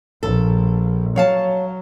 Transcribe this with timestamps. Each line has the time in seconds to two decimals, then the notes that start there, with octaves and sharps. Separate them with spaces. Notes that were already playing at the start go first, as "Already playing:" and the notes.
0.23 A#1 A4
1.16 F#3 C#5 F5 A5